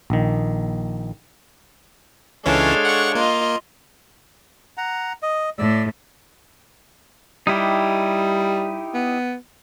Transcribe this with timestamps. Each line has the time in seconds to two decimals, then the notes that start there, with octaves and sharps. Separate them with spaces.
0.10 A#1 D#3
2.46 C#2 E3 G#3 C#4 D4 A4 C#5 F5
2.85 F#5 C#6
3.15 A#3 F4 D#5
4.78 F#5 A#5
5.22 D#5
5.59 A2 D5 E6
7.47 G3 D#4 E4 G4
8.94 B3